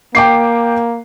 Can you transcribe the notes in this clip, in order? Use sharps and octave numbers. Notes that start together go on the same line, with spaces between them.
A#3 G5 D6 C7